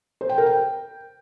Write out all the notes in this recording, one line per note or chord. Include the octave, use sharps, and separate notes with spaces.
C5
G5
A#4
G5